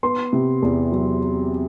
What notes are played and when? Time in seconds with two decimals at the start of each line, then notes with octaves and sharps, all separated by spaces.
0.03 B3 C6
0.33 C3
0.62 E2
0.92 F#3